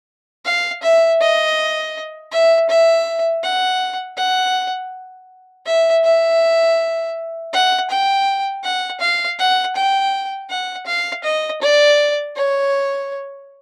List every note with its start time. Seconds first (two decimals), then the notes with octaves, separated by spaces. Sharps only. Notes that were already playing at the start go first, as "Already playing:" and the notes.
0.45 F5
0.83 E5
1.21 D#5
2.32 E5
2.69 E5
3.43 F#5
4.17 F#5
5.66 E5
6.04 E5
7.53 F#5
7.90 G5
8.64 F#5
9.01 F5
9.39 F#5
9.76 G5
10.50 F#5
10.87 F5
11.24 D#5
11.62 D5
12.36 C#5